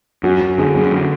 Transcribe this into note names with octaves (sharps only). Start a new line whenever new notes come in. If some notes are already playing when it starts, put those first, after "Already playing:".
F#2 F#4
F#2
D3 G#4
F#2
D3